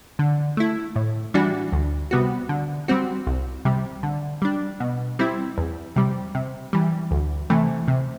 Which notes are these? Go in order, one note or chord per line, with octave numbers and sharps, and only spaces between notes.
D3
A3 E4
A2
E3 G3 D4 F#4
D2
C3 G3 B3 F#4
D3
G3 C4 F#4
C2
C3 G3
D3
G3 D4
B2
G3 C4 E4
E2
C3 G3
C3
E3 G3
D2
C3 E3 A3
C3